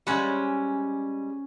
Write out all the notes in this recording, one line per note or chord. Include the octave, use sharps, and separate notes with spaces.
G3 G#3 C#4 C5 F#5